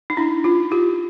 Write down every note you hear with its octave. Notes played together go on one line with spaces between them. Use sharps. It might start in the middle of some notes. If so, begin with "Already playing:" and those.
D#4
D4 E4
D#4 F4
F4 G4